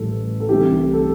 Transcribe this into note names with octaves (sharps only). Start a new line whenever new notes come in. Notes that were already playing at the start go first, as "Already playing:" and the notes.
Already playing: A1 A2 G3 A4
A4
C2 C3 E3 A3 G4
A4